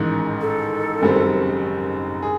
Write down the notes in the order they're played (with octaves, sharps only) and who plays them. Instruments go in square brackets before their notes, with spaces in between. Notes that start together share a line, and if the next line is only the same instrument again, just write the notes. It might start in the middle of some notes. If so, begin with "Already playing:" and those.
Already playing: [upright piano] A1 G#2 D#3
[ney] A4
[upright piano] F#1 F#2 D#3 G3 C4
G#4